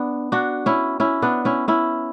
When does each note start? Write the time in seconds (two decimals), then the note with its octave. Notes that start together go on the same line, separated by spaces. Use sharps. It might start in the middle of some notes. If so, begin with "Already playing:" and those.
Already playing: B3 D4
0.32 D4 F#4
0.66 C#4 E4
1.00 C#4 E4
1.22 B3 D4
1.45 C#4 E4
1.68 C#4 E4